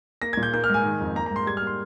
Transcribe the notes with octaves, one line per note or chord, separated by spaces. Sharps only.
A#3 A#6
A#2 G#6
G6
A#3 G6
F6
G#2 G#5
D#3
F2
A#3 A#5
A#5
G#2 C6
G3 G#6
F6
A#3
C6